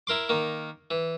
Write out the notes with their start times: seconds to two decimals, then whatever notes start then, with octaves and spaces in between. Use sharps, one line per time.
0.07 E4 A#4 C6 D6
0.29 D#3 A#3
0.91 E3